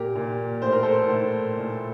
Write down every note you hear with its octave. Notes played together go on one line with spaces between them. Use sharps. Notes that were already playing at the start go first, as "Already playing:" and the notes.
Already playing: A#2 G4 A#4
A#2
A2 C5
A#4
A4 C5
A2
A#2